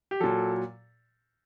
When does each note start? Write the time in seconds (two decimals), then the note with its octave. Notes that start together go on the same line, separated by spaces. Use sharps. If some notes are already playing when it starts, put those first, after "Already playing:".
0.11 G4
0.20 A#2 F#3 A4